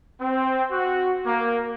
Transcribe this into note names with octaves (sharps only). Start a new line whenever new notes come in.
C4
F#4
A#3